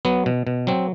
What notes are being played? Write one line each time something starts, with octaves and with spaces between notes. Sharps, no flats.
F#3 B3
B2
B2
F#3 C4